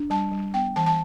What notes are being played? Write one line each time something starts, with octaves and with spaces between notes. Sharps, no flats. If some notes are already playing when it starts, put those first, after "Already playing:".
Already playing: D4
G3 A5
G3
B3 G5
E3 A5
A5